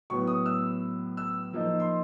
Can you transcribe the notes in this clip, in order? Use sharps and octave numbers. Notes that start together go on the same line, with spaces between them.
A2 F#3 B3 C#6
D#6
E6
E6
F3 A#3 D#4
C6